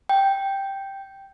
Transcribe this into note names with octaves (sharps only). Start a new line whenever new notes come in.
G5